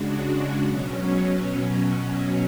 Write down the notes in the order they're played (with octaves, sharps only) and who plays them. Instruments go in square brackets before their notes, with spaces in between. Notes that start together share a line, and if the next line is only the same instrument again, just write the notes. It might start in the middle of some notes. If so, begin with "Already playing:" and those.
Already playing: [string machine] C#3 G#3 D4 F#4
B2 F#3 C#4